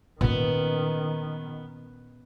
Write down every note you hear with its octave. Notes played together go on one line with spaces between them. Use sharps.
A#2 D#3 B3 C#4